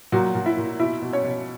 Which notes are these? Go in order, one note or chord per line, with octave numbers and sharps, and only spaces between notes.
A#2 F#3 F#4
A#2
E4 E5
A#2
B2 E4 E5
B2
C#4 C#5
B2